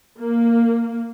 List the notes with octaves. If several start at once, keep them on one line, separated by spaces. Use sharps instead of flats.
A#3